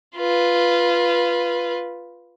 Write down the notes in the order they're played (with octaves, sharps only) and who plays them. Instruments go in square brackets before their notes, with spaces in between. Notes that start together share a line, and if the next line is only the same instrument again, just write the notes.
[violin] F4 B4